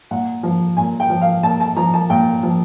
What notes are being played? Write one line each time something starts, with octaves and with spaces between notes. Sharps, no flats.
A#2 F#5
F3
A#2 G#5
G5
F3
F5
A#2 A5
A5
F3 A#5
A5
A#2 G5
F3